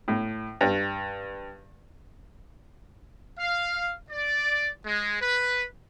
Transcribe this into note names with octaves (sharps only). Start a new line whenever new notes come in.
A2
G2
F5
D5
G#3
B4